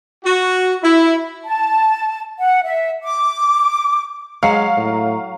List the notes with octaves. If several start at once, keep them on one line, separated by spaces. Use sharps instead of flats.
F#4
E4
A5
F#5
E5
D6
F#3 G#3 F5
A2